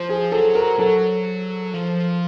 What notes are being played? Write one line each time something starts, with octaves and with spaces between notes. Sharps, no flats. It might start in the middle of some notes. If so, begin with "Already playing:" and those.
Already playing: F3 C5
G#4
F#3 A4
A#4
F#3 A4
F3